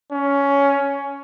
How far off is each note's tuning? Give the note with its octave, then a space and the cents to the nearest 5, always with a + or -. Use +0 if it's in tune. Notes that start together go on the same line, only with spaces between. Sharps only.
C#4 +15